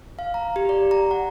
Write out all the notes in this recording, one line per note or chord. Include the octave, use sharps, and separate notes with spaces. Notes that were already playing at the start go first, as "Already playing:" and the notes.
F5
A#5
G4
D5
A#5
F#5